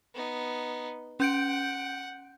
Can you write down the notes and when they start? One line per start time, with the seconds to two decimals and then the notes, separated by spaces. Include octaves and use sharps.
0.15 B3 D#4
1.20 C#4 F#5 G6 D7